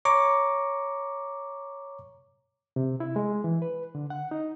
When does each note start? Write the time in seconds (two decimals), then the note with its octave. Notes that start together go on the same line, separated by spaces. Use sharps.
0.05 C#5 A#5 C#6 D6
2.76 C3
3.00 E4
3.16 G#3
3.44 E3
3.62 B4
3.95 D3
4.10 F#5
4.31 D#4